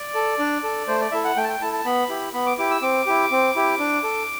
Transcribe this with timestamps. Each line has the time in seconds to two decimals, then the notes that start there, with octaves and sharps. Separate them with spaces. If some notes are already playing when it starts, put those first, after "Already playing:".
Already playing: D5
0.15 A4
0.39 D4
0.63 A4
0.87 A3 C5
1.01 D5
1.12 E4 A4 E5
1.24 F#5
1.36 A3 G5
1.44 A5
1.49 G5
1.61 E4 A4 A5
1.73 A5
1.85 B3 B5
2.09 E4 G4
2.33 B3 B5
2.46 D6
2.58 E4 G4 D6
2.71 E6
2.82 C4 D6
3.06 E4 G4
3.31 C4
3.55 E4 G4
3.79 D4
4.03 A4